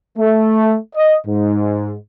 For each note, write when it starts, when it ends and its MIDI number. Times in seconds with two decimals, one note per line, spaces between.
0.18 0.76 57
0.95 1.16 75
1.27 1.94 44